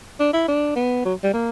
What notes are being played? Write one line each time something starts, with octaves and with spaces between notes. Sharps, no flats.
D4
E4
D4
B3
F#3
G3
A#3